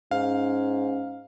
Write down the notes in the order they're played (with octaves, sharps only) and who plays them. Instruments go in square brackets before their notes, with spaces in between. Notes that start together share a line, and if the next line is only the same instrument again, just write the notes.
[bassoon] G#2 [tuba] C#4 [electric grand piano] F5